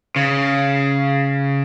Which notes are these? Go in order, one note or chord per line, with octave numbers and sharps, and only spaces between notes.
C#3